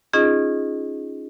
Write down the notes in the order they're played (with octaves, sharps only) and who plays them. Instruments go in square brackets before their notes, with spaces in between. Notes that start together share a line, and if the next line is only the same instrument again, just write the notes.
[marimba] C#4 D#4 F4 G#4 D#5